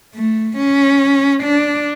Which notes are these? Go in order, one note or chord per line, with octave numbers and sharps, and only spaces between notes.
A3
C#4
D4